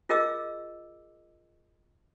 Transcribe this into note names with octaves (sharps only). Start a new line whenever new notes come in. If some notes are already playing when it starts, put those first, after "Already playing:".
F4 G#4 A#4 D#5 D6 E6